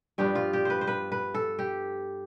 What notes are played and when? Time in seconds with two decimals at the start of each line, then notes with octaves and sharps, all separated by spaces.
0.18 G2 F3 B3 D4 G4
0.35 F4
0.53 G4
0.65 B4 C5
0.81 C5
0.87 B4
1.12 B4
1.34 A4
1.59 G4